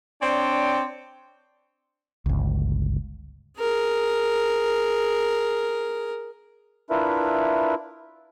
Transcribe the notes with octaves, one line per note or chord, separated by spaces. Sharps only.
C4 D4 C#5 D5 G5
G1 C#2
G#4 A#4
D4 E4 F4 A#4 B4 E5